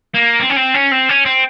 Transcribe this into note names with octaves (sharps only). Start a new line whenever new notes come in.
A#3
C4
C#4
C4
C#4
C4
C#4
C4